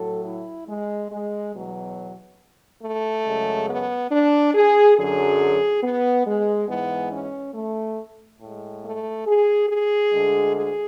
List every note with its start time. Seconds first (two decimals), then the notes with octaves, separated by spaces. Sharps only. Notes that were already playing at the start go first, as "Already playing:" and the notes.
Already playing: A2 F#3 A4
0.25 E4
0.68 G#3
1.11 G#3
1.53 E2 B2 F#3
2.82 A3
3.26 F#2 C#3 G#3
3.69 B3
4.11 D4
4.55 G#4
4.97 F#2 D3 F#3 G#4
5.83 B3
6.26 G#3
6.68 G#2 E3 G#3 B3
7.12 C#4
7.55 A3
8.40 A2
8.45 G#3
8.84 A3
9.27 G#4
9.69 G#4
10.12 D2 D3 G#3
10.55 G#4